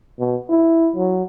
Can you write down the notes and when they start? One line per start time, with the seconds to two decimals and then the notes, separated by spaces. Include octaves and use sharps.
0.19 B2
0.49 E4
0.96 F#3